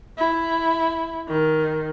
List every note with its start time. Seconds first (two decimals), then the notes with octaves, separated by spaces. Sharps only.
0.18 E4
1.29 D#3